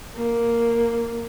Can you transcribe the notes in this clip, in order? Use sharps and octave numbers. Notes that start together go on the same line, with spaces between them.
A#3